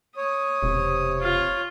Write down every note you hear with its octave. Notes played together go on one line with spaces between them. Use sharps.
C#5 D#6
E1 C3
F4